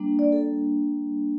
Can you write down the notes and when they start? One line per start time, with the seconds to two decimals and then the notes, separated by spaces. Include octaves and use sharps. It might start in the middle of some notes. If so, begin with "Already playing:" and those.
Already playing: G3 A#3 D4
0.19 D5
0.32 A4